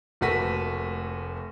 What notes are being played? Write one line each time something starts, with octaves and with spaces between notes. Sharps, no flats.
F1 A3 A#3 F#4 B4 B6